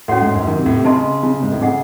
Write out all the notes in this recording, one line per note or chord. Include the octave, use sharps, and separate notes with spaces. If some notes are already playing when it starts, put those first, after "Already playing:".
A2 C#4 F#4 C#5 F#5 C6
G#2
F#2
D#3
C3
A2
C3
C#3 C5 D#5 A5 C6
C#3
C3
G#2
A2
C#3 G#4 D#5 F#5